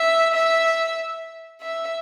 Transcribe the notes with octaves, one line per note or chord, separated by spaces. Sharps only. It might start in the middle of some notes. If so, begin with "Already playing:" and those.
Already playing: E5
E5
E5